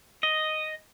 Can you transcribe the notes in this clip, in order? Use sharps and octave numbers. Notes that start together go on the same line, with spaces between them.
D#5